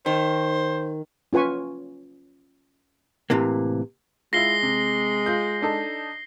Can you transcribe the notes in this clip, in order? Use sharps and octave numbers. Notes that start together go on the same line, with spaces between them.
D#3 C5
C#4 F4 B4 G#5 C#6
A2 C3 E3 A#3
G#3 E4 F4 A#6 C7 G7
C3
F4 G6
D4 D#4 A4